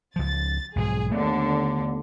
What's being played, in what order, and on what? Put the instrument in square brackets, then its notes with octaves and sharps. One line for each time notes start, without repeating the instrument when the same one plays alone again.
[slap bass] C#2 F3 [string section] A6
[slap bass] B1 G#2 F3 [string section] G#4
[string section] D#2 D3 [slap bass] A3 B3